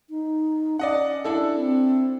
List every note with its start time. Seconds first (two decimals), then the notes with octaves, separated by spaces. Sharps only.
0.10 D#4
0.79 C#4 D5 D#5 F#5
1.24 D4 E4 A4
1.56 C4